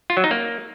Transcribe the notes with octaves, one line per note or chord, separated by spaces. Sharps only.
F4
F#3
D#4
A#3